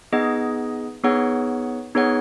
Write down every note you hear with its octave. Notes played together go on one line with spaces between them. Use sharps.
B3 D#4 G#4 D#5 F#5
B3 D#4 G#4 C#5 F#5
B3 D#4 G#4 C#5 F#5